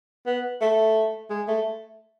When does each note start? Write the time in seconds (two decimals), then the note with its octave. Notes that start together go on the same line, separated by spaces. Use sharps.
0.26 B3
0.61 A3
1.30 G#3
1.48 A3